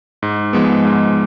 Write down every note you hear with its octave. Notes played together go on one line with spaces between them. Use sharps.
G#2
F3 G#3 B3
G#2